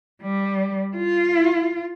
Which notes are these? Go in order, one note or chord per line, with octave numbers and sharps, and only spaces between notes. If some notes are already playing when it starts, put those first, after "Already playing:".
G3
F4